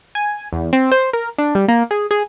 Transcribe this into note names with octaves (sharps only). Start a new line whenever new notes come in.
G#5
E2
C4
C5
A#4
D4
G3
A#3
G#4
G#4